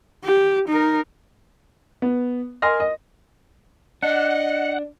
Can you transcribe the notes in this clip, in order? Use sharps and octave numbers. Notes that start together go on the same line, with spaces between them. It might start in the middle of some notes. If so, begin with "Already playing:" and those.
G4
D#4 A#4
B3
A#4 D#5 G#5 C6 F6 A#6
D#5
D4 D#5 F#5